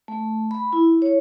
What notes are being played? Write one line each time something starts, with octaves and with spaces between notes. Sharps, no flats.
A3
B5
E4
C#5